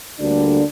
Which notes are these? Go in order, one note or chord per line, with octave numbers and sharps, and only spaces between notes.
D2 D3 G3 A#3 D4